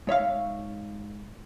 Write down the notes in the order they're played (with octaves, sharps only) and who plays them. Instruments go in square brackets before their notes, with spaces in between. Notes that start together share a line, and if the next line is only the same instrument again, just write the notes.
[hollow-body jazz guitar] G#2 C#5 E5 F5